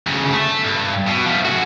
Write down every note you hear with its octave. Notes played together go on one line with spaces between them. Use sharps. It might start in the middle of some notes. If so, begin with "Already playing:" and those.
D2 C#3
A3
G2
B2
F3 A3
F#4 G#4